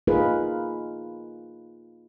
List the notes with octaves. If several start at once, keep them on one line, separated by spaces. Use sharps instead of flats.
A#3 D#4 F4 G#4 A#4 B4